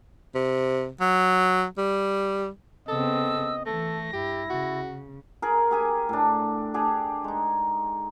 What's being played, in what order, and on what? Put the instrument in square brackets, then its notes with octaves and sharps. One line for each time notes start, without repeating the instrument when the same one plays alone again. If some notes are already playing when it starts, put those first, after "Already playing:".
[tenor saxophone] C3
F#3
G3
[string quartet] C#3 B3 C4 [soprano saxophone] A4 [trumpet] D#5 [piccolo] E6
[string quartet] E3 [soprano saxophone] A3 [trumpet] A4 [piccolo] A#6
[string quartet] G2 [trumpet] E4 [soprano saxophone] G4
[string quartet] C#3 [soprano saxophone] F#4
[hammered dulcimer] G#4 A#4
G4 G#4 G#5
A2 D4
D4 G4 G#4
G#3 D#4